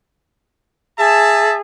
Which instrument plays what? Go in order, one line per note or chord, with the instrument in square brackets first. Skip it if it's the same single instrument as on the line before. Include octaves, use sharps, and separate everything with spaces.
[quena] G#4 [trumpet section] E5 A5